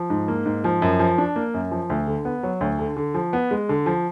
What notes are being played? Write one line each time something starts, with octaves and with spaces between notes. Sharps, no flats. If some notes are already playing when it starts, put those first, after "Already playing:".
Already playing: F3
G#2
A#3
G#2
F3
F#2
F3
D4
A#3
F#2
F3
D2
D3
B3
F#3
D2
D3
D3
F3
B3
G#3
D3
F3